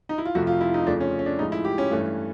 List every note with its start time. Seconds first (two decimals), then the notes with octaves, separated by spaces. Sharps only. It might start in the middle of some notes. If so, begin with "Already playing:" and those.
0.09 D#4
0.18 E4
0.25 F4
0.35 F2 C3 F3 A3 F#4
0.47 F4
0.61 E4
0.74 D#4
0.87 F2 C#3 F3 A3 D4
1.00 C#4
1.19 C#4
1.26 D4
1.39 A2 F3 G#3 D#4
1.52 E4
1.65 G4
1.78 C#4
1.91 G2 E3 A3